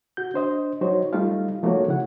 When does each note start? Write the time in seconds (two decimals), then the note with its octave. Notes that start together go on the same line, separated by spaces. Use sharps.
0.17 F#4 G6
0.34 D4 C5 D#5
0.81 F#3 D#4 F#4 C5 C#5
1.13 G3 A3 D#4 F4 F5
1.63 F3 A3 A#3 D#4 F#4 C#5
1.88 C#3 E4 F#5